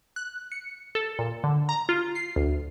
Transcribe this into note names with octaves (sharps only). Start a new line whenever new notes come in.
F#6
C#7
A4
A#2
D3
A#5
F4
C7
D2